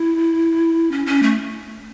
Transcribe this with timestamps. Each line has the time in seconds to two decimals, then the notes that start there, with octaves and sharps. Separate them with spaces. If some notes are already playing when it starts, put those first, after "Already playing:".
Already playing: E4
0.92 C#4
1.06 C#4
1.23 A3